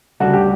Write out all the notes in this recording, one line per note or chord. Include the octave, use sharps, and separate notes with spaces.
D2 C#3 G3 D4 F#4 A4
G4